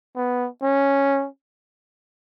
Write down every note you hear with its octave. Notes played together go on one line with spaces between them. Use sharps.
B3
C#4